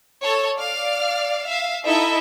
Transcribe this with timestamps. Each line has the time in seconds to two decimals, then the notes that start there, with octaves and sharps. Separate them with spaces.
0.23 A4 C#5
0.57 D5 F5 F6
1.48 E5 F5
1.85 D#4 E4 A4 D#5 E5